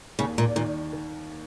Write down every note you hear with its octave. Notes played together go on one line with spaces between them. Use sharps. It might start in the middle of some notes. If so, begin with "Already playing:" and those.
D#2 C#3
A#2
A#2 D#3
D#3